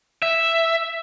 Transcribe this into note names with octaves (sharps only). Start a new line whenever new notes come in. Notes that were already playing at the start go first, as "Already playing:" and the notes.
E5